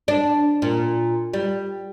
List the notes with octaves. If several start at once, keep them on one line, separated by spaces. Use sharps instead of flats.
D4
A#2
G3